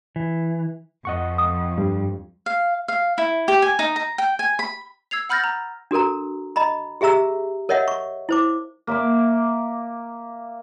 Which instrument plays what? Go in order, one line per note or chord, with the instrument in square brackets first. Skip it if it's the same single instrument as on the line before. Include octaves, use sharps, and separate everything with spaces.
[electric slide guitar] E3
[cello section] F2 [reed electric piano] D#5 F#5 C#6
[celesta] D#6
[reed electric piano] G2 G3
[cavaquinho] F5
F5
E4
G4
G#5
D#4
A#5
G5
G#5
B5
[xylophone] E6 G#6 C7 F7
F#5 B5 F6 G6 A6 A#6
A#5
[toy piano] D4 F#4 A4 A#4 A#5
D#5 A#5 B5
G4 G#4 E5 A#5 E6
A#4 C#5 D#5 E5 F#5
C#6
E4 C5 D6
[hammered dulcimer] A#3 E5 D6